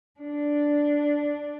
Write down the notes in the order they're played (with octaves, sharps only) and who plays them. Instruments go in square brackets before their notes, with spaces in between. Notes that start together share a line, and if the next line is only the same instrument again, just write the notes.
[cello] D4